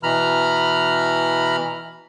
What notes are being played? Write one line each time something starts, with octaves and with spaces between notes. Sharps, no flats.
B2 E3 A#5 B5 F6